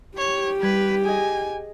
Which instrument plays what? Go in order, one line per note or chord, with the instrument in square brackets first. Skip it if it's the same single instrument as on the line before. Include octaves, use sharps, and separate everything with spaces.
[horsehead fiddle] G4 [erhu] C#5
[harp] G3 G#6 [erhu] B4
[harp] G#4 D#5 [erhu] G#5